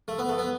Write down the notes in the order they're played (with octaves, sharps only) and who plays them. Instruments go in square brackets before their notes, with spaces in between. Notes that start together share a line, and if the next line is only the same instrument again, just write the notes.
[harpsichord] A3
B3
A3
B3